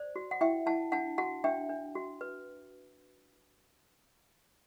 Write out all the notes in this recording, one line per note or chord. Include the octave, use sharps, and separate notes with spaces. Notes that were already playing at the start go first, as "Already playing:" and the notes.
Already playing: C5 D5
F#4
F#5
E4 E5 G5
E4 F#5 A5
D4 F#5 A5
F#4 F#5 A5
D4 E5 G5
D4
F#4
B4